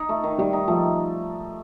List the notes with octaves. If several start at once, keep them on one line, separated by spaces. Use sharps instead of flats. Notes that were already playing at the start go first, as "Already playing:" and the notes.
Already playing: D#4
A3
D#3
D#3 G3
D#4
F3 A3